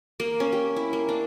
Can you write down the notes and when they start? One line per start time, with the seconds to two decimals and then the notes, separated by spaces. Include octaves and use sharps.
0.20 A#3
0.40 C#4
0.52 G4
0.76 E4
0.93 A#3
1.09 D4